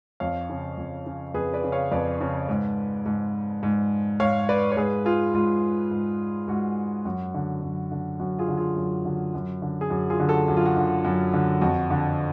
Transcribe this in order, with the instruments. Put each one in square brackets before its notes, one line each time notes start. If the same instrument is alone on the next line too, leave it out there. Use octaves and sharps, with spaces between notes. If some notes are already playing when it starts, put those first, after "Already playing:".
[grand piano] F2 C#5 F5
C#3
F2
C#3
F2 G#4 B4
B4 D5
C#3
C#5 F5
F2 B4 D5
C#3
G#2
G#2
G#2
G#2 C#5 F5
B4 D5
C#5
G#2 G#4 B4
F4 G#4
G#2 F4
G#2
G#2 F#4
F#2 F#4
D3
F#2
D3
F#2 F#4
F4 G#4
D3
F4 G#4
F#2
D3
F#2
D3
G#4
F#2 F#4
F4 G#4
D3
F#4 A4
F#2 F#4
F4
F#4
D3
F#2
D3
F2 F#4
D3